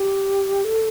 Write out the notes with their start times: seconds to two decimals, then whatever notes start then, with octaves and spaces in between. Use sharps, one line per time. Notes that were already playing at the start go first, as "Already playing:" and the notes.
Already playing: G4
0.64 A4